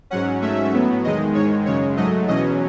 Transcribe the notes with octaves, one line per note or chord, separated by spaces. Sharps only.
G#2 F#3 C#4 F#5
G#2 F#3 A3 C#4 E5
A2 F#3 B3
E2 D#3 G#3 D#5
G#2 D#3 G#3 C#5
F#2 C#3 G#3 C#5
G#2 F#3 A3 D#5
E2 B2 F#3 C#4 D#5